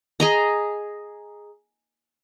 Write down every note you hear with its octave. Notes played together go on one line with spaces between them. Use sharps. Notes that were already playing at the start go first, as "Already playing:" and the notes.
G#4 D#5 A#5